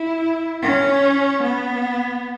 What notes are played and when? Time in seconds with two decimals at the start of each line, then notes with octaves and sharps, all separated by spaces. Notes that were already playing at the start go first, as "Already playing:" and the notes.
Already playing: E4
0.62 C#4
1.42 B3